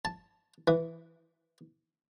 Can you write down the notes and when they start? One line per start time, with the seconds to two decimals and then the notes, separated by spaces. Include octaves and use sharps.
0.05 A5
0.68 E3